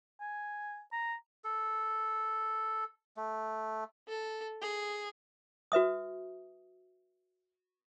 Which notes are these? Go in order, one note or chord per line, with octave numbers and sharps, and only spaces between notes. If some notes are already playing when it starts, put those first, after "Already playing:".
G#5
A#5
A4
A3
A4
G#4
F#4 B4 E5 D#6